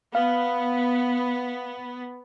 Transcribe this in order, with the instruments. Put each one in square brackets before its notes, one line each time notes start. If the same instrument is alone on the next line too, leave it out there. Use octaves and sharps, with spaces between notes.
[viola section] B3 [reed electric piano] F5